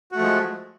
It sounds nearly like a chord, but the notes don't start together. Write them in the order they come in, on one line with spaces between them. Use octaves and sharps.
F#4 A3 F3 G#3